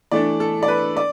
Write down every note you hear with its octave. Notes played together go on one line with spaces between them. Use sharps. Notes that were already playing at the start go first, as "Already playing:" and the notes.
E3 A3 D4 D5
A4
D5
B4
D5